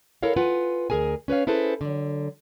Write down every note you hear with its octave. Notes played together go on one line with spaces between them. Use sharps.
E4 A4 A#4 C#5 F5
F4 B4 F#5 G#5
D2 G#4 A#4 G#5
C#4 B4 C#5 F5
C#4 E4 G#4 A4 B4 C5
D3 F#3